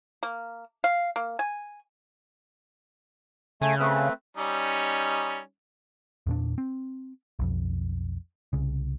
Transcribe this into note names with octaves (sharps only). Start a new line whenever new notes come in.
A#3
F5
A#3
G#5
C#3 A3 G#5
A3 C4 B4
G3 C#4 D#4
E2 A#2 D4
C4
B1 F2
C2 C#3